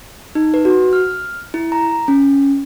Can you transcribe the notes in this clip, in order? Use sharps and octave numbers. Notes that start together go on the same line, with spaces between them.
D#4
B4
F#4
F6
E4
A#5
C#4